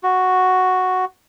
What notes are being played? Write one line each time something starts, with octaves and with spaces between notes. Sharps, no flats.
F#4